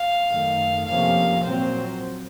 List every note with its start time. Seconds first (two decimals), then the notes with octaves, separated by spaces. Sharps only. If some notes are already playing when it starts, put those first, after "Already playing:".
Already playing: F5
0.30 F#2 D#3 A3
0.86 F2 C3 F3 A#3 C#4 F5
1.43 A#2 F#3 C4 C5